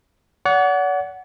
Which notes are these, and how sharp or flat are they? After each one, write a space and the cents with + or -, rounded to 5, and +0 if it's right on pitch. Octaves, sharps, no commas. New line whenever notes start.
D5 -45 F#5 +0